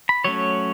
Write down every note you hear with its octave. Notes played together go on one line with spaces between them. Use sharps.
B5
F#3 A3 C#4 C#5